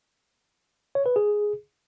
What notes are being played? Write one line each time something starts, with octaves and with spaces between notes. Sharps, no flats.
C#5
B4
G#4